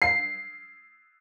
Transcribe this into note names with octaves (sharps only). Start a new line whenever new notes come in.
C7